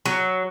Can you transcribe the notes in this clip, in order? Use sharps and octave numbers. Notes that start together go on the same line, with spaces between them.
F#3